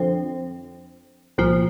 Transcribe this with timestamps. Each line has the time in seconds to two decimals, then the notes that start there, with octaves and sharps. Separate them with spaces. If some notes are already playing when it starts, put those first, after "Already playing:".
Already playing: F2 D3 F3 C4
1.38 C2 A#2 F3